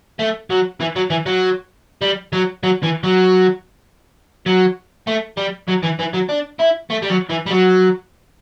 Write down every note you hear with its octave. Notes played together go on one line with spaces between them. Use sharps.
A3
F#3
E3
F#3
E3
F#3
G3
F#3
F#3
E3
F#3
F#3
A3
G3
F#3
E3
E3
F#3
D4
E4
A3
G3
F#3
E3
G3
F#3